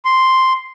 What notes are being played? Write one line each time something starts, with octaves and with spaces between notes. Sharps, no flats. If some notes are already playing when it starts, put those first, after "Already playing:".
C6